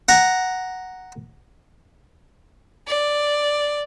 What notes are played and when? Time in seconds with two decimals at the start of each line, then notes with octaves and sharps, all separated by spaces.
0.08 F#5 A#5
2.87 D5